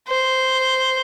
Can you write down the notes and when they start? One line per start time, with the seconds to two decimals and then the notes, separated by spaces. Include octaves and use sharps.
0.08 C5